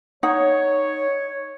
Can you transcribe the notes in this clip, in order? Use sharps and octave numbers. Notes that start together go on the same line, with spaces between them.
D#4 C#5 F#5